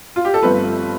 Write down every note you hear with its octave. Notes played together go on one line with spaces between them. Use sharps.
F4
G4
A4
G1 G2 F3 A3 C4 B4